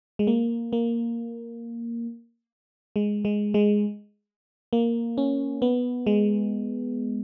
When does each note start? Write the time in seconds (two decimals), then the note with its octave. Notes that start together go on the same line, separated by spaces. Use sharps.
0.19 G#3
0.27 A#3
0.73 A#3
2.96 G#3
3.25 G#3
3.54 G#3
4.73 A#3
5.18 C#4
5.62 B3
6.07 G#3